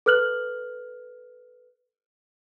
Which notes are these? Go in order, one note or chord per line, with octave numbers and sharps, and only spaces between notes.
A4 B4 F6 F#6 F#7